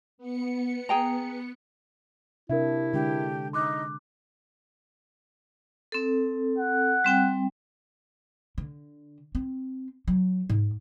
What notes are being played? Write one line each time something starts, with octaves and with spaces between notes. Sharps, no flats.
B3 C#7
G#4 G5 A#5
C3 D4 E4 A#4 E5
D3 G#3 D4 G4
D#4 C6 D6 F#6
C4 A4
F#5
G3 C4 G5
D3
C4
F#3
G#2